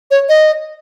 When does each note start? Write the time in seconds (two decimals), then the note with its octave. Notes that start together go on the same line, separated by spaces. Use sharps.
0.11 C#5
0.29 D#5